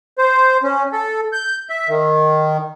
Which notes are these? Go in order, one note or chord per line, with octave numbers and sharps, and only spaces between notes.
C5
C#4
A4
G6
E5
D#3